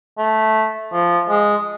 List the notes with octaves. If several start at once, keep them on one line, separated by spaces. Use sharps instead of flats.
A3
F3
G#3